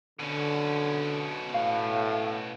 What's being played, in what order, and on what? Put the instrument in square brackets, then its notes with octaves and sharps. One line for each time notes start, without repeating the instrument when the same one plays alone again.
[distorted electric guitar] B2 C#4 [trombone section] D3
[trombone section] A2 [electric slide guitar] F5